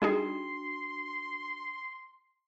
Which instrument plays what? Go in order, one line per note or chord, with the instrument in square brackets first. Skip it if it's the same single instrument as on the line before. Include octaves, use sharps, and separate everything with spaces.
[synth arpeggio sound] G3 D#4 G#4 [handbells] D4 F#4 [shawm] C6